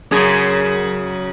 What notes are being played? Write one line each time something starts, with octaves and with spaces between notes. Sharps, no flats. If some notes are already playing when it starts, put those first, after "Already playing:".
F#2 C#3 G#4